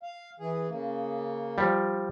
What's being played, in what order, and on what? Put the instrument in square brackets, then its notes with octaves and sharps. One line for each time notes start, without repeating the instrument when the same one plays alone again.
[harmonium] F5
E3 G#4
C#3 A#3
[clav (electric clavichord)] F3 G3